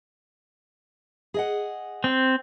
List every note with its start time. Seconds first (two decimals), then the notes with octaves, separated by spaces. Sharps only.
1.34 G#4 D#5 F#5
2.04 C4